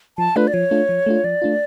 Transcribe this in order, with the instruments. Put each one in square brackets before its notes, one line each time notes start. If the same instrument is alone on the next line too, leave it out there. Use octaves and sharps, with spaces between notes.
[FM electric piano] F3 [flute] A5
[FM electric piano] A3 D4 F4 [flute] B4
[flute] D5
[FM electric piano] F3 [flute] C#5
[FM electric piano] A3 D4 F4
F3
A3 D4 F4
[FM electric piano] F3 [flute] D5
[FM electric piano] A3 D4 F4